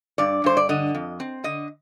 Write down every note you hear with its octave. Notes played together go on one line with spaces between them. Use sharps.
G2 D5
G2 C5
D5
D3 D#5
F2
C4
D3 D#5